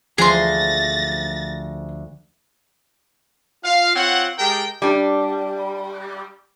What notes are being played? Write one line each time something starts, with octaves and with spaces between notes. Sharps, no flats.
D2 F3 G#4 C6 A6 A#6
F4 F5
C4 F4 C#5 F#5
G#3 G4 A4 A#4 G5
G3 D4